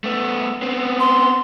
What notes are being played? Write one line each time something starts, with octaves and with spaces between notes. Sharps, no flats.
A3 B3
B3 C4
C6